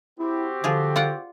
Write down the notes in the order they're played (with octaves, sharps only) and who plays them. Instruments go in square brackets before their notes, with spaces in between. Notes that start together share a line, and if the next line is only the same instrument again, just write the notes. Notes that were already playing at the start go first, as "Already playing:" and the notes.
[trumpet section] C4 F#4 G4 [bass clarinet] E4
[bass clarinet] D3 [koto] F3 F4 G#4
[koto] F4 D5 F#5